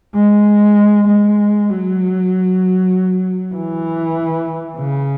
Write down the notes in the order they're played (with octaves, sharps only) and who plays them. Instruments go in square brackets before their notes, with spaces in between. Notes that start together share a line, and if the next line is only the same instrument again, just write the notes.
[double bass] G#3
G#3
F#3
E3
C#3